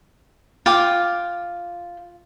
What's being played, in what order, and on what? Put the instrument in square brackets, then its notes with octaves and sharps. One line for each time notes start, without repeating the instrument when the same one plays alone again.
[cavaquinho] F4 G5 D6